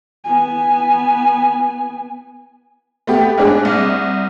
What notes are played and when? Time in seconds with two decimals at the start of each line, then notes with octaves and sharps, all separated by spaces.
0.24 B3 G#5
3.07 A3 B3 G4
3.38 G#2 D4 G#4
3.65 C2